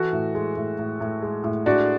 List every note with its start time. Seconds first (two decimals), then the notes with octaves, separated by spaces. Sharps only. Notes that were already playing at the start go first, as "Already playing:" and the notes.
Already playing: E3 F#4 A4
0.13 A2
0.35 G#3
0.57 A2
0.79 A2
1.00 A2
1.22 G#3
1.44 A2
1.66 G#3 D4 F#4